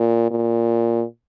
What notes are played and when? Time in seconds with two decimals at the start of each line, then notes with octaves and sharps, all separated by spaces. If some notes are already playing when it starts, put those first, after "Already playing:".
Already playing: A#2
0.31 A#2